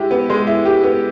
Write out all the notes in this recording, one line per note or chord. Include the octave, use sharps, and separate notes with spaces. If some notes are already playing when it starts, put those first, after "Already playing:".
Already playing: G#3 E4 G4
B3
G#3
E4
G4
B3